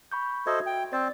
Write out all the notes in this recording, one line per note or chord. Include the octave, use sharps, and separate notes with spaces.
B5 C#6 G6
F#4 A4 C5 D#5 E5 G#6
G5
C4 C5 D5 A6